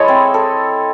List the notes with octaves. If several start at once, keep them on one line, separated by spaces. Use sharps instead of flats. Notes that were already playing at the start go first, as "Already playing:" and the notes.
Already playing: G#3 E4 A4 C#5 D#5
C4
A4